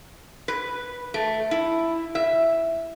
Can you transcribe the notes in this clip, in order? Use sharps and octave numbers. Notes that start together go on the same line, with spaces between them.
B4
A3
E4
E5